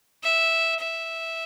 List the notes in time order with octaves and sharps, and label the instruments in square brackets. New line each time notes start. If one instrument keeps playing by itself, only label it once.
[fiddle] E5
E5